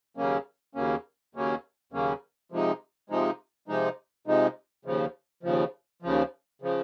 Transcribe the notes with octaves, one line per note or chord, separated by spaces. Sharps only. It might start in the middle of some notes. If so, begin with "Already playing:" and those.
D#2 C#3 F#3 A#3 C#4
D#2 C#3 F#3 A#3 C#4
D#2 C#3 F#3 A#3 C#4
D#2 C#3 F#3 A#3 C#4
C3 F3 G#3 D#4
C3 F3 G#3 D#4
C3 F3 G#3 D#4
C3 F3 G#3 D#4
D#2 C#3 F3
D#2 C#3 F3
D#2 C#3 F3
C#3 F3